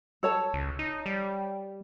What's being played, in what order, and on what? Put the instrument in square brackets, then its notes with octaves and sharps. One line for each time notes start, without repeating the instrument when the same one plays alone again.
[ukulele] A4 C#5 A5
[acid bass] C#2
D#4
G3